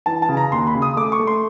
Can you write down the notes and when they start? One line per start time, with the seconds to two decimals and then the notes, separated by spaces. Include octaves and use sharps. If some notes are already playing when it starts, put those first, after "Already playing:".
0.06 E3 A5
0.22 A5
0.29 C#3
0.37 A#5
0.52 D#2 C6
0.67 B5
0.75 C#3
0.82 D#6
0.97 A3 D6
1.12 C#6
1.19 A3
1.27 C6